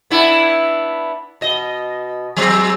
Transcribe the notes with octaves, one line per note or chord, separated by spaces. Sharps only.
B3 D4 E4
B2 D#5
F#3 G#3 C4